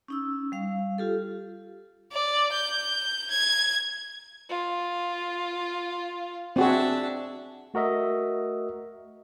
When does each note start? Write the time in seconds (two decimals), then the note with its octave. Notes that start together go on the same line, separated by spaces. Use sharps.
0.08 C#4 D#4 E6
0.52 G3 F5
0.98 F4 G4 A4
2.12 D5
2.52 G6
3.31 G#6
4.50 F4
6.56 C4 D4 F#4 G#4 E5
7.74 A3 F#4 A#4 D#5 E5